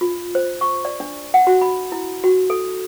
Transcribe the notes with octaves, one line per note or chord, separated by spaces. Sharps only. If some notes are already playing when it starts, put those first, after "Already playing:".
F4
C5
C#6
D5
D4
F#5
F#4
B5
E4
F#4
A4